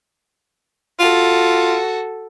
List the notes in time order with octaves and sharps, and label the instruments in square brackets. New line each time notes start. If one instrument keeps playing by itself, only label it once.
[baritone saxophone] F4 [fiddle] F#4 A4